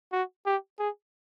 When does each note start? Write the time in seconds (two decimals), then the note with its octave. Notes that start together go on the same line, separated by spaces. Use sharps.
0.12 F#4
0.46 G4
0.79 G#4